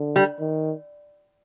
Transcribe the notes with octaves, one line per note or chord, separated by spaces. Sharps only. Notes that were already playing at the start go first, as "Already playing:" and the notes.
Already playing: D3
G3
D#3